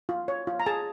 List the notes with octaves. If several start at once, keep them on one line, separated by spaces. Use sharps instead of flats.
F4
C#5
F4
A#5
G#4 A5